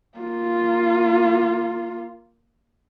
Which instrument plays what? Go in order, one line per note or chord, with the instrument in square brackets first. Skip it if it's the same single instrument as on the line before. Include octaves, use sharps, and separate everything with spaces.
[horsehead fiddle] A#3 F4